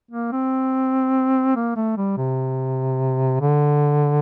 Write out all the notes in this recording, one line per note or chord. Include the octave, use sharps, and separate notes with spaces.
A#3
C4
A#3
A3
G3
C3
D3